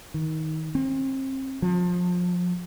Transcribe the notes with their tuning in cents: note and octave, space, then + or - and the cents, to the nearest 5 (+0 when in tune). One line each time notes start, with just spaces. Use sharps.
D#3 +25
C4 +35
F3 +30